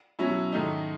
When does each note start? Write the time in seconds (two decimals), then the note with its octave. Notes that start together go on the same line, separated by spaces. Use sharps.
0.19 B2 F#3 C#4 E4
0.52 G#2 D#3 A3 D#4